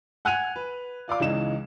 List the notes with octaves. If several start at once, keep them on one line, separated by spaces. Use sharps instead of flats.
F#5 G#5 F#6 G#6 D#7 F7
B4
F4 D5 F5 D6
C#2 C#3 E3 D#4 E7